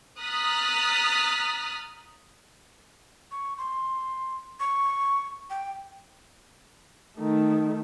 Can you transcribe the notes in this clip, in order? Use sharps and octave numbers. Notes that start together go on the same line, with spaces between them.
A#5 D#6 F6 F#6 A6 B6
C#6
C6
C#6
G5
D#3 A3